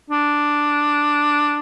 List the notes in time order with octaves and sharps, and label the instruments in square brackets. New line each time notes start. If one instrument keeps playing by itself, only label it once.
[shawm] D4